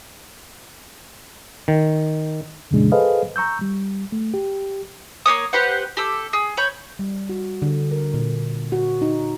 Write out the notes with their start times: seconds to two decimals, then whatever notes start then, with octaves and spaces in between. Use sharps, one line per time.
1.68 D#3
2.71 F2 A#2 C#3 E3 G#3 D4
2.92 G#4 A4 B4 C5 D#5 F5
3.36 A#5 C#6 E6 G6
3.61 G3
4.12 A3
4.34 G4
5.26 A#3 B3 C#5 D#6
5.53 G4 B4 C5 F#5
5.97 G4 A4 E6
6.33 G#4
6.57 C#5 B5 G6
6.99 G3
7.29 F#4
7.62 D3
7.91 A#4
8.14 A#2
8.72 F#4
9.02 D#4